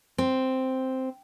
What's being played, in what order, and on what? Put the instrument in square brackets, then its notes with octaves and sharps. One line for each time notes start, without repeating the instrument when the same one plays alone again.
[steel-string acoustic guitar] C4